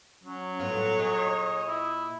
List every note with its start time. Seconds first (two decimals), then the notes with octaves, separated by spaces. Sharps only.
0.24 F#3 C#4
0.60 A2 B3 F4 C#5
0.99 A#2 G#4 D#5
1.68 E4